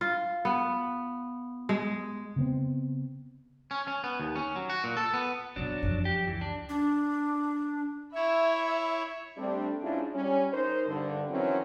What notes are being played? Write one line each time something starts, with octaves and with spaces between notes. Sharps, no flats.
F4
B3
G#3
C#3 B3 C4
C#4
C#4
B3
D#2
C#4
F#3
F#4
A#2
A4
B3
F#2 B2 F#3 D4
F#2 F3
G4
C#2 E3
D4
D4
E4 C#5 E5 B5
G3 A3 C4 D4
G#2 C#4 D4 E4 F4
G3 C#4
D#4 A#4 C5
G2 D3
D#3 E3 F#3 C4 C#4